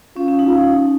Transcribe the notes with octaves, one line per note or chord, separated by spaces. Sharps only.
C#4 F4
C#4
D#4
F4
D#4